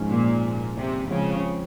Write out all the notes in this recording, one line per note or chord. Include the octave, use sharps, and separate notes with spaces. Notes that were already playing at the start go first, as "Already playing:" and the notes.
Already playing: G#2 F3 G#3 C#4
A#2
C3
C#3 F3 G#3 C4